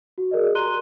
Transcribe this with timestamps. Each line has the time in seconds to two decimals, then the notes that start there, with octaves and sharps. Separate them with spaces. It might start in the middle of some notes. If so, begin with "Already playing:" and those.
0.18 F#4
0.31 G#4 A#4 D5 D#5
0.55 G4 A#5 C6 F#6 D#7 G7